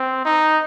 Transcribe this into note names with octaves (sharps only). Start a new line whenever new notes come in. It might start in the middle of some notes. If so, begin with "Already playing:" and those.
Already playing: C4
D#4